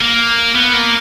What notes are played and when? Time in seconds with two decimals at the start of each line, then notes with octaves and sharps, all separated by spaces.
0.01 A#3
0.55 B3
0.73 A#3